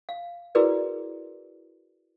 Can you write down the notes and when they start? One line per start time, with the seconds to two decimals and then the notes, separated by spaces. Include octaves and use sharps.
0.09 F5
0.55 E4 F#4 G#4 A#4 B4 D5